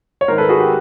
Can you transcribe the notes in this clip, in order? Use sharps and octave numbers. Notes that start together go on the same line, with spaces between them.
C#5
G#2 D#3 A#4 C5
A4 B4
F#4 G#4
G4